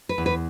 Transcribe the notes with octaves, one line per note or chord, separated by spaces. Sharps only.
B4
E2
B4